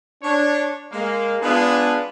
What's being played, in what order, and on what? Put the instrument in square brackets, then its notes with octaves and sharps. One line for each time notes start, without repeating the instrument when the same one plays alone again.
[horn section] D4 C#5
G#3 A#3
G#3 B3 D4 F4 G#4 B4